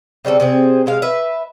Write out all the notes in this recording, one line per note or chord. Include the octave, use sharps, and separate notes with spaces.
C#3 G3 C4 A4
C3 C4 G#4
C3 G#3 F5
B4 E5